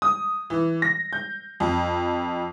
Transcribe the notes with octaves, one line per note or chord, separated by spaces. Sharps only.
D#6
E3
A#6
G6
F2